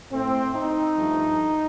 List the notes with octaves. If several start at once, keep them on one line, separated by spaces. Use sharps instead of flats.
A2 A3 C4
D#4
G2 F3 A3